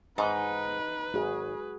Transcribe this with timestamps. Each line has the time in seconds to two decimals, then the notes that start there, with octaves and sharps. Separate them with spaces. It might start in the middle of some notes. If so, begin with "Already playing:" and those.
0.18 G#2 D#4 B4
1.14 G#1 F#4 G#4